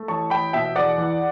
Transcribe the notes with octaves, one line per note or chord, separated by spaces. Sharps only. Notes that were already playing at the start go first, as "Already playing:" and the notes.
Already playing: A3
A1 A5 C#6
A1 G5 B5
B2 E5 G5
E5
E2 D5 F#5
E3